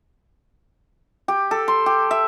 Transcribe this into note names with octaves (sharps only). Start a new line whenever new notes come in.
G4
A4
C6
G4
E5